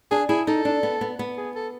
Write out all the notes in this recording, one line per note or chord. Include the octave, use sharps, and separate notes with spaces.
D4 G#4
E4 G#4
D#4 A4
D4
B3
B3
B3
G#4
A4